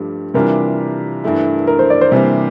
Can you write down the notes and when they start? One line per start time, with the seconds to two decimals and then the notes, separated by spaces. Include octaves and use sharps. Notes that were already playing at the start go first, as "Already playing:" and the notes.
Already playing: G2 F3 A3 G4
0.34 C3 E3 G3 D4 F4 A#4
1.24 G2 E3 A3 E4
1.67 A#4
1.79 C5
1.90 D5
2.01 C5
2.12 C3 E3 G3 A#3 D4